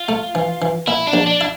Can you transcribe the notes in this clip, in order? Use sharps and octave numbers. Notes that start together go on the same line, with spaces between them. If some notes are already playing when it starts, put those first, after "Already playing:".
Already playing: F4
A3
E3
E3
A#2 E4
D4
A#1
D4
E4